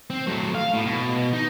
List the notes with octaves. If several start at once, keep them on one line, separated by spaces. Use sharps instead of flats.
C4
F#3 A3
F5
A2 B3
B2
D#4